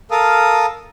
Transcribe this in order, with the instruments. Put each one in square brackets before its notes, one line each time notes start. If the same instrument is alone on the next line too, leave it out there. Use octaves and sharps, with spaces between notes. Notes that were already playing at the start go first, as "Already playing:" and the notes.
[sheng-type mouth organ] A4 A#4 F5 D#6